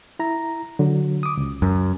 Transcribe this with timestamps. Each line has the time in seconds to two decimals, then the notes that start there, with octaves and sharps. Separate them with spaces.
0.19 E4 A#5
0.79 D3 F#3
1.23 D6 D#6
1.37 C#2
1.62 F#2